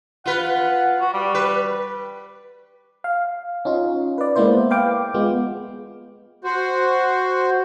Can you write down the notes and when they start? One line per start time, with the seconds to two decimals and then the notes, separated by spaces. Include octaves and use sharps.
0.26 F4 B4 F#5
1.01 F#4
1.14 G3
1.35 B4
3.04 F5
3.65 C#4 D#4 F4
4.18 B4 D5
4.35 G#3 A#3 B3 E4 C5 D5
4.70 B4 F5 G5 D6
5.14 G#3 B3 F4
6.44 F#4 C5